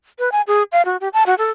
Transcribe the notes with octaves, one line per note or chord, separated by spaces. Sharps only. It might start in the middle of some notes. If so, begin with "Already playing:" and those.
B4
G#5
G#4
F5
F#4
G4
A5
F#4
A4